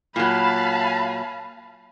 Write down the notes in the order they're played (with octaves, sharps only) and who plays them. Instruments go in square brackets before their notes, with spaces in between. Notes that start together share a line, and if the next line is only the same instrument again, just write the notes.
[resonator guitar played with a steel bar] A#2 F#3 [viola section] F5 A5 B5